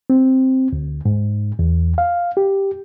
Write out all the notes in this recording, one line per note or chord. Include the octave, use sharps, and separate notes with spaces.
C4
D2
G#2
E2
F5
G4